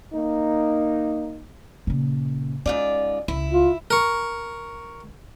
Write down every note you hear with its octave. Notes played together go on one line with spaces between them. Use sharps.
A#3 D#4
A#2 C#3
G#2 C#4 F4 D5
C#2 E4
F4
A#4 C#6